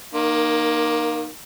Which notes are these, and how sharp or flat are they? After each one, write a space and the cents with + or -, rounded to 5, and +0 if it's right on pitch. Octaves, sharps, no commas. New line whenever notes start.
D#3 -15 A#3 +15